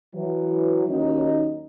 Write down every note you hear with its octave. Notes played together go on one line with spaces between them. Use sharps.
E3 F#3
D#2 F#3 C#4 D#4